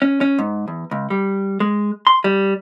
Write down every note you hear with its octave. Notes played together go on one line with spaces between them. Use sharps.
C#4
C#4
G#2
E2
C#2
G3
G#3
C6
G3